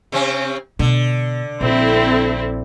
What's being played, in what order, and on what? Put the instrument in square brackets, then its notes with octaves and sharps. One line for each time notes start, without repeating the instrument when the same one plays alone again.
[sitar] C3 C4 C#4
[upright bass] B2 [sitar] D3
[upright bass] A#1 [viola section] C4 E4 A4